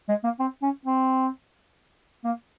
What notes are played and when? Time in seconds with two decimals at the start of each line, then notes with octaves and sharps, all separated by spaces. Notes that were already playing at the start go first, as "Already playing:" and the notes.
0.09 G#3
0.24 A#3
0.39 C4
0.62 C#4
0.86 C4
2.24 A#3